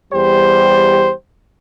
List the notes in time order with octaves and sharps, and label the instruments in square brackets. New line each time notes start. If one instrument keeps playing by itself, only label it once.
[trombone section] E2 G3 G4 C5